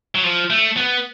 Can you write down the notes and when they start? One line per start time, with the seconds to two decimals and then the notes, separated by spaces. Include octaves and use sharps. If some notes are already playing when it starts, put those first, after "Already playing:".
0.15 F#3
0.24 F3
0.50 A3
0.77 B3